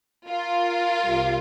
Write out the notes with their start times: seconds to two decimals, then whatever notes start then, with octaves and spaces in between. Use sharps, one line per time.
0.27 F4 A#4
1.04 C2 C3 G3